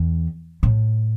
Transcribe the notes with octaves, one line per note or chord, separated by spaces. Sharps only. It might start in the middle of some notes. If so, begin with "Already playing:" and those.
Already playing: E2
A2